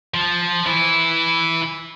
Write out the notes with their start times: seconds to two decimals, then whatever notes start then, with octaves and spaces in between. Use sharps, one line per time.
0.14 F3
0.66 E3 E4